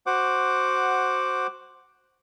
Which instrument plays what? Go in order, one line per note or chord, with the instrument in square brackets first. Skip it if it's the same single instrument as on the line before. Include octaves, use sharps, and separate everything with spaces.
[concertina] F#4 C5 F#5 D6